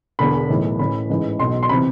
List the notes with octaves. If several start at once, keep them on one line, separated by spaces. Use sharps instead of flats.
E1 E2 D3 B5
B1 A2 E3
A1 A2 E3 B5
A1 G#2 E3
B1 B2 C6
C6
C3 E3 B5